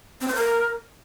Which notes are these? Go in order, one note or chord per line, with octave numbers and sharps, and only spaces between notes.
C4
C5
A#4